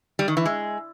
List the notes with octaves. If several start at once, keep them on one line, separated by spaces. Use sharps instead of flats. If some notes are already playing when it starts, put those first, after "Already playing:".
G3
D#3
E3
G#3